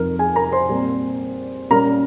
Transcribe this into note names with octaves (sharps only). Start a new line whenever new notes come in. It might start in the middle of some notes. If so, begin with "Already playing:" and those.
Already playing: F2 C3 F3 C4 D#4 A#4
G#4 G#5
A#4 A#5
C5 C6
A#2 G3 C4
A#2 G3 A#3 C#4 A#4 A#5